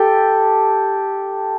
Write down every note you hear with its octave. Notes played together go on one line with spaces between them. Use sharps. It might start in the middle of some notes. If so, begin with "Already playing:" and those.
Already playing: G4 A4